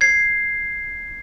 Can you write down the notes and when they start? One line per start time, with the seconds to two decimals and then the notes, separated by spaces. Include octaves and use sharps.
0.01 G#6 C7